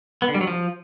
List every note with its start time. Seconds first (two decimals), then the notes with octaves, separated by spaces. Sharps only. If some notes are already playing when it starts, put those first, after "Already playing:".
0.22 B3
0.28 D3
0.35 G3
0.41 F#3
0.47 F3